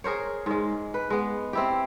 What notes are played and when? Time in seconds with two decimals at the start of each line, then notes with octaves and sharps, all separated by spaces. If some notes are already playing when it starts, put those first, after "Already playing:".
0.04 G#4 A#4 C5 C#5
0.46 G#2 G#3
0.94 B4
1.10 G#3 B3
1.53 C4 E4 G4